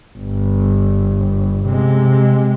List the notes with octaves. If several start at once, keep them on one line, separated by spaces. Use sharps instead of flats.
G1
C3 G#3